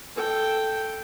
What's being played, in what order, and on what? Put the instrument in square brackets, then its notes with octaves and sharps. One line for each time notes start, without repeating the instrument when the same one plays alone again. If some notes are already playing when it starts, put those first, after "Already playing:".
[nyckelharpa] A4 G5